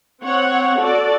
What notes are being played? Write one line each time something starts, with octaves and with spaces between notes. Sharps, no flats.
C4 C#5 F#5
F#4 A4 D5